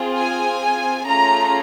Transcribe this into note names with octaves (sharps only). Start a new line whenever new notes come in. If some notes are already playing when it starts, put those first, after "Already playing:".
Already playing: C4 F4 G#4
G#5
A3 C#4 F4 G#4 A#5